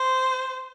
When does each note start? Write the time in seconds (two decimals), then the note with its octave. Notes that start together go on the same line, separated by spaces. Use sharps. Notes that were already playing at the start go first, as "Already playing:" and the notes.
Already playing: C5